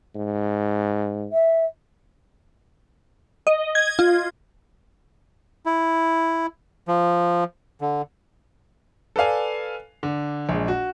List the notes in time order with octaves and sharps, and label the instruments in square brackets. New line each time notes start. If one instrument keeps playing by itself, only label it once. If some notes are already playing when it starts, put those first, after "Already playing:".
[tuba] G#2
[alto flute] E5
[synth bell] D#5
G#6
F4
[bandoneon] E4
F3
D3
[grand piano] A4 B4 D5 F5 G#5
D3
A#1 G#3
F#4